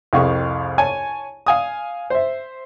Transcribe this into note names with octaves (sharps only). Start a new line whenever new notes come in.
C2 F2 G#4 F5 G5 C#6
C#5 G#5 A5
F5 G#5 D#6
C5 E5